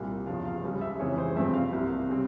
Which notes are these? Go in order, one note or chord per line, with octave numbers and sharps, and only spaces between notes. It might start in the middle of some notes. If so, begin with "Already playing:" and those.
Already playing: C2 A#2 G3
E2 C#3 F3 F5
F5
C#2 C#3 G3
E5
F2 C#3 E3 G#3 C#5
C5
G2 F3 C4 E5
F5
C2 C3 G3 A#3
C#3 G3 C4